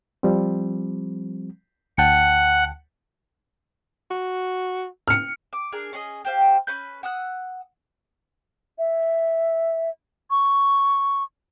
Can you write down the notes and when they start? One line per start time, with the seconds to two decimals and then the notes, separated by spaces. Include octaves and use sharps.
0.23 F3 G3 C4
1.98 D2 F#5 G5 A5
4.11 F#4
5.08 F6 C#7
5.53 D6
5.72 D4 G#4 A#4 G#5
5.93 C#4 G#4 D#5
6.25 G4 C5 F5
6.67 C#4 B4 G6
7.03 F#5 D#6 E6 F#6
8.78 E5
10.31 C#6